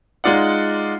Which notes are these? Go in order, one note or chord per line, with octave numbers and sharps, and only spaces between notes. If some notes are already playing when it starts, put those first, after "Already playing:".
G#3 D#4 F4 D5 F#5